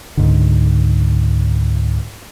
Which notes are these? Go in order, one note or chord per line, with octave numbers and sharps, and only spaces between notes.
C#2 G#2 D3